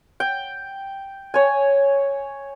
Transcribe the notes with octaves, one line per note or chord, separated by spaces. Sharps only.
G5
C#5 G#5